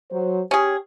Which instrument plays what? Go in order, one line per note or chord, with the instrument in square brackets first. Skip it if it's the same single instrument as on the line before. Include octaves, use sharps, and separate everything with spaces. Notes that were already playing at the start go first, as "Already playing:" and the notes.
[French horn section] F#3 C5
[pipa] C#4 G#4 [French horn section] G4